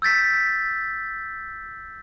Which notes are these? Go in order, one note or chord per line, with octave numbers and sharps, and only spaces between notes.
E6 G6 A6 B6